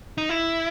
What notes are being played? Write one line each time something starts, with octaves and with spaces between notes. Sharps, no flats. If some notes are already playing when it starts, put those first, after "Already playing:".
D#4
E4